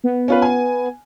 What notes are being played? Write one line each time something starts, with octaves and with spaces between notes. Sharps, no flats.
B3
C#4 F4 B4
G#5